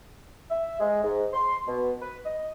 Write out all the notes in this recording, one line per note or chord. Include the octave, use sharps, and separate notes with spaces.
E5
G#3
G#2
C6
B2
B4
D#5